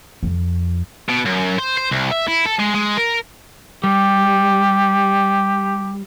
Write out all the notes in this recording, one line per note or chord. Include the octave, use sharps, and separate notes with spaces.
F2
B2
F#2
C5
C5
C2
E5
E4
A4
G#3
G#3
A#4
G3 G4